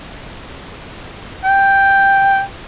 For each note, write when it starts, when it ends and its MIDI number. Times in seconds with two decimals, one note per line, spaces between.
1.45 2.40 79